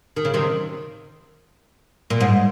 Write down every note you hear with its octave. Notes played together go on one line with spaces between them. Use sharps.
D#3
C#3
C3 D#3
A#2
G#2